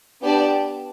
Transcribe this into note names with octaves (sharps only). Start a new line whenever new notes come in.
B3 D4 G4 D5 A5